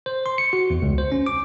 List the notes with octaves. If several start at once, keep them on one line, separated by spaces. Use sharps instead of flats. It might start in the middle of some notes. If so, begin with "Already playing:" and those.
C5
C6
C#7
F#4
E2
C#2
C5
C#4
D6